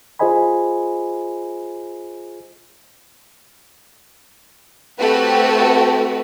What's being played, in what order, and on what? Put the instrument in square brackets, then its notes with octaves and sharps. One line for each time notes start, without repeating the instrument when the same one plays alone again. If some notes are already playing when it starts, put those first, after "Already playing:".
[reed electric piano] F4 G#4 C5 D#5 G#5 B5
[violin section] A3 C4 F#4 G4 A4 B4